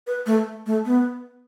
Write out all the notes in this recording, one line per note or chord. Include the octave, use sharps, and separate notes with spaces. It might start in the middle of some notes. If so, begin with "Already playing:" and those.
B4
A3
A3
B3